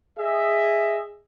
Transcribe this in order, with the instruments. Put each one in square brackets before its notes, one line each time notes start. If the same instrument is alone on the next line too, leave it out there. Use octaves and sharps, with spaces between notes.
[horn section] G#4 D#5 E5